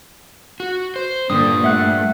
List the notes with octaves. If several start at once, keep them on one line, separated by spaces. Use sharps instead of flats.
F#4
C5
A#2 D3 G3 D4 D#6
A3 E5 F#5 F#6